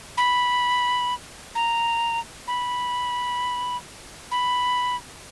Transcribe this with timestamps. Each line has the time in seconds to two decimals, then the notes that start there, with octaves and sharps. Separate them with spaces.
0.17 B5
1.55 A#5
2.48 B5
4.31 B5